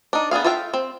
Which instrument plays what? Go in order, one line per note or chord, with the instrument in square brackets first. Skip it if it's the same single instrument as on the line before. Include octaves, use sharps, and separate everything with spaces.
[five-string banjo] D4 D#4
B3 D4 G#4 F5
F4 A4 E5 F5 G5
C4